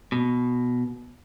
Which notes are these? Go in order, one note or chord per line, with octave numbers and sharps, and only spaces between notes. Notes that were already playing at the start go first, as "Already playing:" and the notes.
B2